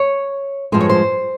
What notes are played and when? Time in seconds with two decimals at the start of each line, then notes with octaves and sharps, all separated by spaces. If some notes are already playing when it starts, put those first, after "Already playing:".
Already playing: C#5
0.72 G2 F3 G#3 C5
0.80 C#5
0.89 C5